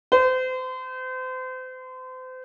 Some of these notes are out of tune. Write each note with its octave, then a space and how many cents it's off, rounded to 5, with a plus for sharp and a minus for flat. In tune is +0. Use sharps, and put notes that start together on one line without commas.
C5 -35